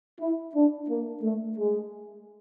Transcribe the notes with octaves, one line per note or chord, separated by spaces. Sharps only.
E4
D4
A#3
A3
G#3